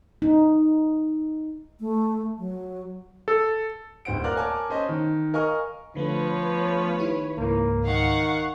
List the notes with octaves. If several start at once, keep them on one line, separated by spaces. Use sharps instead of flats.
D#4
A3
F#3
A4
D1 C5 F#5 D7
A#4 D5 F5 D6 F#6
A#4 C#5 G#5 A5 D6
C#4 C5 D#5
D#3
A#4 D#5 F5 G#5 C#6 F6
D3 F3 A3 B3 B4 C#5
D#3 E4 G4
C#2 G#2 E3 A#3
D#3 F5 F#5 C#6